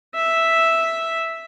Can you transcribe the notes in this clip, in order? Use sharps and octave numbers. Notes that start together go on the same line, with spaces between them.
E5